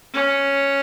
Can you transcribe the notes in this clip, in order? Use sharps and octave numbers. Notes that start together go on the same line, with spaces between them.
C#4